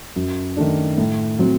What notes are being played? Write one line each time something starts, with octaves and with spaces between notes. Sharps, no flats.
F#2
D#3 A3 D4
A2
F#3 C4